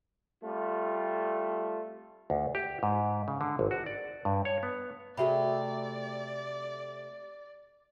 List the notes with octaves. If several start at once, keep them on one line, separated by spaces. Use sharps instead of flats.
G3 A3 C4 F4
D2
G4
G#2
C#3
D3
G#1
F#4
D5
G2
C#5
B3
C3 A3 F#4 G#4 D5 E5 B5